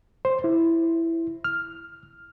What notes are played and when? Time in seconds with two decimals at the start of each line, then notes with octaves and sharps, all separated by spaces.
0.25 C5
0.44 E4
1.44 F6